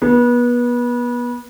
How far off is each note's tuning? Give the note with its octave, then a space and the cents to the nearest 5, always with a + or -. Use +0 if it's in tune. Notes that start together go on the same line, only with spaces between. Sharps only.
B3 -30